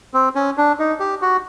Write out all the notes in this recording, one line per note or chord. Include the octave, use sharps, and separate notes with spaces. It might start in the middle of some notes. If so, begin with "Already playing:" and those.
C4
C#4
D4
D#4
G4
F#4